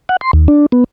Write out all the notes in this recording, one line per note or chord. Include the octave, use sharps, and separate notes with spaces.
F#5
C6
D#2
D4
B3